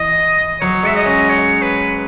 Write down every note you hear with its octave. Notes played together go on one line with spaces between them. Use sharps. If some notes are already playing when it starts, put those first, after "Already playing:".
Already playing: E3 D#5
F#3 C#5
G#3 E5
D#5
C#4
C#5
B4